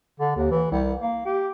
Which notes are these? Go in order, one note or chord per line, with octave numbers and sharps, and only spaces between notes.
D3
D#2
E3
C2
A#3
G4